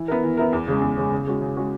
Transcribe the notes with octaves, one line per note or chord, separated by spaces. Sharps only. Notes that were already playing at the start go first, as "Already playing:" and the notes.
Already playing: E3
B3 E4 A#4
E3
B3 E4 A#4
E2
C#3 G#3 C#4
E2
C#3 G#3 C#4
C#3
G#3 C#4 F#4
C#3
G#3 C#4 F#4